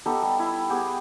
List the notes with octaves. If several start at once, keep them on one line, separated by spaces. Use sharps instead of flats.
B3 D#4 G4 A4
G3
E4
B3 G4 G#4